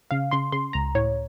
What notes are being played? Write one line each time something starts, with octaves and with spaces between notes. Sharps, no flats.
C#3 F5
C#3 C6
C#3 C6
C#2 A#5
A2 C#5